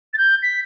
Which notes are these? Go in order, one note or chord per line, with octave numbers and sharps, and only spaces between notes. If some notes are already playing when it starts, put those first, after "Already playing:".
A6
G6
B6